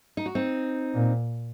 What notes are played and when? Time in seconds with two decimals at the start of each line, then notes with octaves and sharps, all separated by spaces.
0.17 D#4
0.26 F#4
0.35 C4 D#4
0.94 A#2